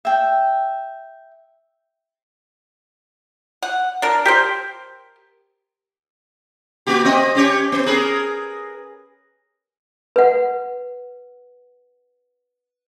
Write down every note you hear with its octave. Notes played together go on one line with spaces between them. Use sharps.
E5 G5
F#5
D4 A#4
G4 A#4 C5
A#3 F#4 G4
C4 D#5
C#4 G4 C#5
B3
G#4 A#4 B4
B4 F#5